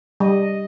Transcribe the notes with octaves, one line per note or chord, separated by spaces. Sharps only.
G3 D#5